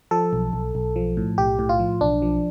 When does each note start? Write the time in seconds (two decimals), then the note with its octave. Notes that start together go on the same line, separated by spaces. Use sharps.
0.11 F3 A4
0.33 B1
0.53 B1
0.75 B1
0.96 F3
1.17 A2
1.38 B1 G4
1.59 A2
1.69 F4
1.79 F3
2.01 B1 D4
2.22 F3